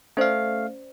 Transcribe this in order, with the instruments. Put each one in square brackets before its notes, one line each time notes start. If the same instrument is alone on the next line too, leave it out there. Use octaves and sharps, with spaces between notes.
[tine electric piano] A3 F5 [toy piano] C#4 C5 D5